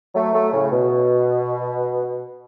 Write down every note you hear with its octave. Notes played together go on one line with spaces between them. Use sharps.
F#3 A3
F#3 A3
A2 C#3
B2